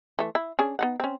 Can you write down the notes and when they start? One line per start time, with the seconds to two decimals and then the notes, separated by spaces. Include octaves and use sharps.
0.19 E3 A3
0.35 E4
0.59 C#4 D4 G#4
0.79 B3 D#4 F#5
1.00 C4 C#4